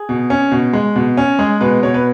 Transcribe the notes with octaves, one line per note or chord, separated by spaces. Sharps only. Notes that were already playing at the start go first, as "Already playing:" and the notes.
Already playing: G#4
B2
C#4
B2
G#3
B2
C#4
G#3 G#4
B2 B4
B2 C#5
B4